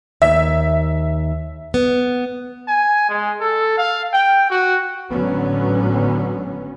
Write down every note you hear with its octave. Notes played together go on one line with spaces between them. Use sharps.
D#2 E5
B3
G#5
G#3
A4
F5
G5
F#4
G#1 A2 D3 F#3 B3 C#4